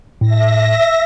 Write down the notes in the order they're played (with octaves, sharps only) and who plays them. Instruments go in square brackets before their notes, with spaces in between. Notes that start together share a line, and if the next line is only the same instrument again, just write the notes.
[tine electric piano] A2 [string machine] E5 A#6